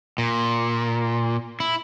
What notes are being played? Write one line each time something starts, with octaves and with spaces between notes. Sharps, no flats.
A#2
E4